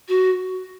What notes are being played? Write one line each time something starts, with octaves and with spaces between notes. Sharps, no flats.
F#4